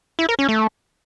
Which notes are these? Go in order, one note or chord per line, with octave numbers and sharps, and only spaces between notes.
E4
A#4
C#4
A3